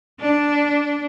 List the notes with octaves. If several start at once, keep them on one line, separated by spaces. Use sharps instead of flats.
D4